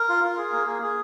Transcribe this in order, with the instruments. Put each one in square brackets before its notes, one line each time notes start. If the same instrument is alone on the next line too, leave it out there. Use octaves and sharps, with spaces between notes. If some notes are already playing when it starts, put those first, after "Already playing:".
Already playing: [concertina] A#4
F4
F4
G#4
A#3
G#4
G#4